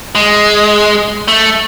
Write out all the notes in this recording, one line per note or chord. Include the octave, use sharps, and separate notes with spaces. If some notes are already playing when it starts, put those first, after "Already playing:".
G#3
A3